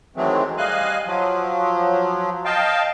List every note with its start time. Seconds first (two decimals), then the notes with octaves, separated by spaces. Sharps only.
0.16 D#3 E3 F#3 G#3 A3 C4
0.58 G3 D#5 F5 G#5 F#6
1.06 F3 F#3
2.45 D#5 F5 G5 A5